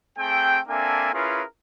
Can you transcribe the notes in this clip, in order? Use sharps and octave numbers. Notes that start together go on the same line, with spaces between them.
A3 C4 G#4 G5
A#3 C4 D4 A4 E5 G#5
C#4 E4 F4 G#4 A#4 B4